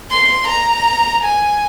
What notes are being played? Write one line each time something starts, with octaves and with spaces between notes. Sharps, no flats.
C6
A#5
G#5